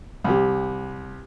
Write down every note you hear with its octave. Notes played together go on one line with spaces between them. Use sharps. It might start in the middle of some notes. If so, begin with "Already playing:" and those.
C2 G4